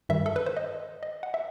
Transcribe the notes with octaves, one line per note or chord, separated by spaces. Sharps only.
G2 D#3 G3 E5
A4
B4
C5
D#5
D#5
F#5
E5